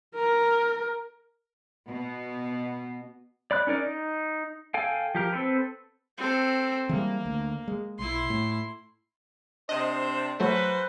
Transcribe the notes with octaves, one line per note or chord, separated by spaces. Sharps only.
A#4
B2
D5 B5 F#6
C#4 D#4 A#4 D5
D#4
A4 F5 G5 G#5
F3 G4 A#4
C4 A4 B4
C4 A4
E3 G3 G#3 A#3
D2
G#3
B1 E4 C6
A2
C3 D4 C5 D#5
G#2 F#3 A3 F#4 B4 C5